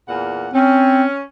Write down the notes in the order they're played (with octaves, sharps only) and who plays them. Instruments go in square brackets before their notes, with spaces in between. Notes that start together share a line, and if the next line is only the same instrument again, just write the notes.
[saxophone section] E2 A#2 F#5
[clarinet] C4 [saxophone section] C#4